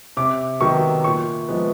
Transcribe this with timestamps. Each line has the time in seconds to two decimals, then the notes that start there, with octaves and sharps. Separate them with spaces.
0.17 C3 D6
0.61 D#3 F#3 B3 C#6
1.04 A#2 C#6
1.49 F3 G#3 B3